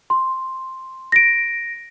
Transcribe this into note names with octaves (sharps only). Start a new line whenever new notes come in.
C6
A#6 D7